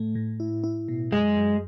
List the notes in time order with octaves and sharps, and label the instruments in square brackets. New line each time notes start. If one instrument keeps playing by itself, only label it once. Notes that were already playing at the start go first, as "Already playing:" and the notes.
Already playing: [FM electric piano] A2 A3
A2
E4
E4
B2
[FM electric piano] F#2 [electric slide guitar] G#3
[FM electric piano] F#2